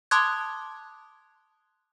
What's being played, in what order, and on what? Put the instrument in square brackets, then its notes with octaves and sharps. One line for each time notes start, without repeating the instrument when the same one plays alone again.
[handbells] A5 C6 D6 D#6 F#6 G#6